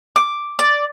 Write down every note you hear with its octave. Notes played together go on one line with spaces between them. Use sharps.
D6
D5